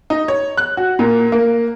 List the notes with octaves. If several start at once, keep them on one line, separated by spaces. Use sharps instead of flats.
D#4
C#5
F#6
F#4
A#2
A#3